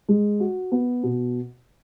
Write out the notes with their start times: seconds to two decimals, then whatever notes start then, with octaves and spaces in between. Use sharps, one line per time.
0.09 G#3
0.40 F#4
0.72 B3
1.03 B2